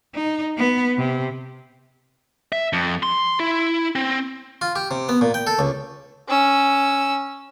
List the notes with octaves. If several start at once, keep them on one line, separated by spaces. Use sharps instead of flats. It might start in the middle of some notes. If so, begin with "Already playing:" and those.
D#4
B3
C3
E5
F2
C6
E4
C4
F4
G4
C3
B3
A#2
G5
A4
C#2
C#4 E6